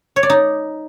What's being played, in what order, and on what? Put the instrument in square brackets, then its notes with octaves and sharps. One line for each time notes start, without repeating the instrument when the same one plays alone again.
[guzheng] C#5
D5
D#4